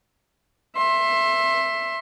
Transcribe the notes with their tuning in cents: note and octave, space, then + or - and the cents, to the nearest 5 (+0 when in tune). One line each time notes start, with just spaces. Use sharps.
E5 +10 C6 +25